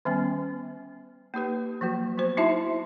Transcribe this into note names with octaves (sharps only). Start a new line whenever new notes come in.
D#3 G3 B3 C#4
A#3 D#4 G4 B4
F3 F#3 A#3 F#4
F#3 B3 F#4 C5
D#4 E4 F#4 E5 A5 C6